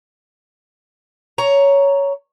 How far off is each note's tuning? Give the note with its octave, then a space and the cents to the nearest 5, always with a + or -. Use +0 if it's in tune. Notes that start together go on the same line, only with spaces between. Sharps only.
C#5 +10 A#5 +0